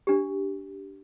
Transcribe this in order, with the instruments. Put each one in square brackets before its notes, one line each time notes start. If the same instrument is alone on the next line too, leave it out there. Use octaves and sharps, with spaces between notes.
[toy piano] D4 G4